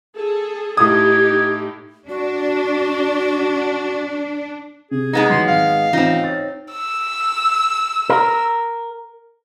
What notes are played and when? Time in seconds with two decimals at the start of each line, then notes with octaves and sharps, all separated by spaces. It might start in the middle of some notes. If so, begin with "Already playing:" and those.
0.15 G#4 A4
0.77 A2 D#4 G4 D#6 G#6
2.09 D4 F#4
4.91 C3 G#4
5.13 G#3 B3 D#4
5.30 E2 F#3 C6
5.47 G#1 F5
5.93 A1 C4 D#4 F4 E5
6.24 C#5 A6
6.72 E6
8.10 A#4